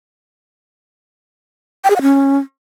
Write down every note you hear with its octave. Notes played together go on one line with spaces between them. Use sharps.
G5
G#4
F#5
C#4